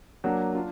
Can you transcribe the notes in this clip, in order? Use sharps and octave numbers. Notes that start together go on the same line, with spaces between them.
F#3 A#3 D4
D4 F4